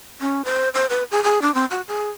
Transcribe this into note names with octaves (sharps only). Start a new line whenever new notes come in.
C#4
C5
C5
B4
G#4
G#4
D4
C4
F#4
G#4